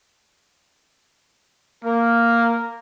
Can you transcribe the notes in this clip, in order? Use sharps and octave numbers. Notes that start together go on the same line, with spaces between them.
A#3 A#4